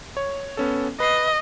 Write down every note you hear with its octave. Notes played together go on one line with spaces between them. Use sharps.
C#5
B3 C#4 A4
B4 D#5 C7